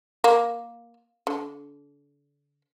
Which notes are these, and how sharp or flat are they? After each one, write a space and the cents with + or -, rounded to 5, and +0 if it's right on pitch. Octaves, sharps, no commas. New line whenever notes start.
A#3 +10
D3 -35